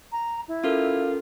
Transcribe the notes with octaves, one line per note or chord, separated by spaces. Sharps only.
A#5
E4
C#4 F4 A4 A#4